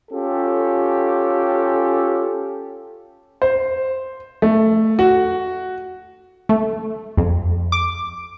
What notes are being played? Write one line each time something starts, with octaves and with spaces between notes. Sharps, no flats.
C#4 F4 G4 A4
C5
A3
F#4
A3
F2
D6